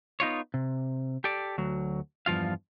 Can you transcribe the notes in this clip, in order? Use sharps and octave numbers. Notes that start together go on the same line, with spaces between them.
B3 D#4 F4 C#5
C3
G4 A4 D5
D2 F#3
E2 G2 F3 F4 F5